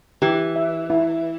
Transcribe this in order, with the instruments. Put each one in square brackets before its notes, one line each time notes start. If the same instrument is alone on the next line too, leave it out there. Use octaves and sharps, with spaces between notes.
[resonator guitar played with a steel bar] E3 [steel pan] G4
[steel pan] E5
E4